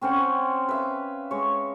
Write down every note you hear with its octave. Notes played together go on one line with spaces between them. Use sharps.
C4 C#4 C5 F#5
B4 E5 F5
G#3 C#5